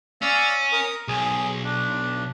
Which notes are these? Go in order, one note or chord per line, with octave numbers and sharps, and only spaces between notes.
C#4 D5 F5 E6
A#4 D#6
B1 G#4
D4